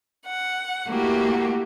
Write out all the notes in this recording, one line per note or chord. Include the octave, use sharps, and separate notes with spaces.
F#5
A3 A#3 E4 F#4 G4